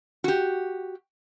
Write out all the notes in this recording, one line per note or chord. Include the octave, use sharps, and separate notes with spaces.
F#4 G4